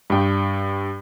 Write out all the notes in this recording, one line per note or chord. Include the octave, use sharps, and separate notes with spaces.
G2 G5